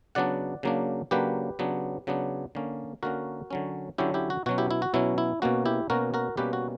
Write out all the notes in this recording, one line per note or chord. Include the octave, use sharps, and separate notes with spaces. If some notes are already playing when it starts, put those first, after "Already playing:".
C#3 F#3 B3 D4 D5 F#5
C#3 F#3 A#3 D4
C#3 F#3 A#3 D4 G4 B4
C#3 F#3 B3 D4
C#3 F#3 B3 D4
D3 A#3 C#4
D3 A#3 C#4 F#4 A#4
D3 F#3 C#4
D3 F#3 C#4 E4 G4
E4 G4
F#4
B2 F#3 C#4 F#4
E4 G4
E4
F#4
B2 F#3 C#4 E4
E4
B2 A#3 C#4 F#4
E4 G4
B2 A#3 C#4 F#4 A#4
F#4 A#4
B2 G3 A#3 C#4 G4 B4
F#4